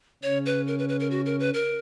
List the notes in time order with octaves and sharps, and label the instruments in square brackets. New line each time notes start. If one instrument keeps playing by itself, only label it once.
[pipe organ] C#3 C#4 [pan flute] C#5
[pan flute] B4
A#4
B4
B4
A#4
F#4
A#4
B4
A#4